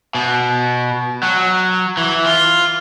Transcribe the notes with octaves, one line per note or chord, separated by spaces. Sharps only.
B2
F#3
E3
F4